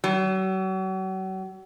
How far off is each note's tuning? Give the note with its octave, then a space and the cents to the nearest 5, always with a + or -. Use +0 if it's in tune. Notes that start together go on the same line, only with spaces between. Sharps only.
F#3 +40